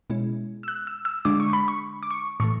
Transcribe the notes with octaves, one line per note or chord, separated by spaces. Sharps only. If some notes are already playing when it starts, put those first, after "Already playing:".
B2 G#3 C#4 E4
E6
F#6
E6
E6
D3 G#3 D4 D6
C#6
B5
C#6
D6
C#6
A2 E3 A3 C#6